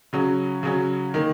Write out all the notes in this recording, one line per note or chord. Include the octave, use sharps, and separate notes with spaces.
C#3 F#3 C#4
C#3 F#3 C#4
D#3 A#3